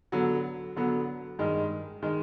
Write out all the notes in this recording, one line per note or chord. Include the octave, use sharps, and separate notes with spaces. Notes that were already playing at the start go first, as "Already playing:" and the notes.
D3 F#3 B3
D3 F#3 B3
G2 D#3 G#3
D#3 G#3